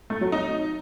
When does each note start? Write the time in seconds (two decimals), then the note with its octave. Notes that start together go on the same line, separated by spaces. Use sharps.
0.10 A3
0.21 F#3
0.32 D#4